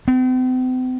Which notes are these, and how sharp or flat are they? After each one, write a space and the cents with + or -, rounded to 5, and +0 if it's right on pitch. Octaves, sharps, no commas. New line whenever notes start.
C4 -45